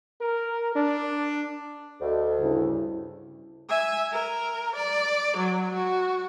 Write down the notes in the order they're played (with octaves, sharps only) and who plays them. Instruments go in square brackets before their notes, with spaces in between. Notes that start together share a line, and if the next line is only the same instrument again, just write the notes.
[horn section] A#4
D4
[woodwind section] D2 [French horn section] A4 D#5
[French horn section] G2 C#3 E4
[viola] E5 G#5
A#4
D5
F#3
F#4